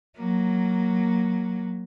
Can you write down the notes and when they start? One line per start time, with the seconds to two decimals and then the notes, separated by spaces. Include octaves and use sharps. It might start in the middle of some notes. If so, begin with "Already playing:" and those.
0.17 F#3 A#3